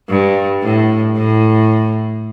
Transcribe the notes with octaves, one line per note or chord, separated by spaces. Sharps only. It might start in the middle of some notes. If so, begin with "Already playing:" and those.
G2
A2
A2